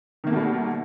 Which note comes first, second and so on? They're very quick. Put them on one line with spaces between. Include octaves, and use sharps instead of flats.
D#3 A#3 A3 B2 G3